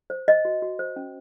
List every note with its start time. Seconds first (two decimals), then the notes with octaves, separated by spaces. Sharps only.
0.10 C5
0.28 C5 D#5
0.45 F#4
0.62 F#4
0.79 C5
0.96 C#4